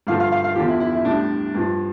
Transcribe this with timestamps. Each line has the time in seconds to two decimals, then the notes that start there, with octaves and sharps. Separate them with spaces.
0.07 G2 D3 F3 F5
0.20 F5
0.32 F5
0.44 F5
0.56 E2 D3 F3 G4
0.68 E4
0.80 E4
0.93 E4
1.05 A2 G3 D4
1.54 G2 F3